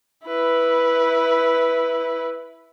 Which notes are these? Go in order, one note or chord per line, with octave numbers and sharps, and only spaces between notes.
E4 B4